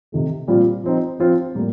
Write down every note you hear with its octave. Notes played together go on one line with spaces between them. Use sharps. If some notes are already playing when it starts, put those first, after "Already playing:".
C3 D#3 A3
A#2 G3 C4 F4
F3 C4 D#4
F3 C4 F4
A2 G3 A#3